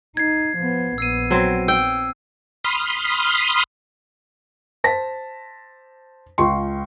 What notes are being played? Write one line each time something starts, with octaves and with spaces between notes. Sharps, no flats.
D#4 G#6 C7
F3 B3
A#1 B3 E6 C7 D#7
F#3 C4
G5 E6
B5 C6 D#6 F6
C5 A5 A#6 B6
C#2 F4 C6 C#6